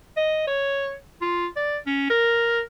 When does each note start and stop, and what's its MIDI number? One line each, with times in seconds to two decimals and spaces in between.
0.17 0.46 75
0.47 0.93 73
1.21 1.46 65
1.56 1.78 74
1.86 2.06 61
2.10 2.61 70